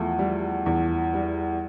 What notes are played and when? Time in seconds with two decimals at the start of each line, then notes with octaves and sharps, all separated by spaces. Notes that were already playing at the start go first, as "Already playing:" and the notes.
Already playing: E2 F3 A3
0.19 G3
0.66 E2
1.14 G3